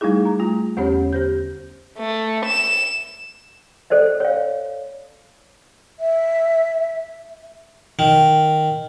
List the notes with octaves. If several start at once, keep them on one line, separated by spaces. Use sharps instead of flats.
G3 A3 D#4 E4 G#4
A#5
A3 F4
E2 D3 B3 C#4 G4 C#5
G4 C5 G6
A3
E7
A4 C5 D5 D#5
C#5 F5
E5
D#3